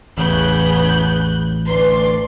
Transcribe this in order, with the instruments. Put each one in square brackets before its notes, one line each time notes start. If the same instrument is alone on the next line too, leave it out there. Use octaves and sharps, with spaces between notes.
[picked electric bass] A1 [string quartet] E2 C#3 B3 [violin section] F#6 G6
[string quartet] D2 D5 [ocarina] B4 [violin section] C6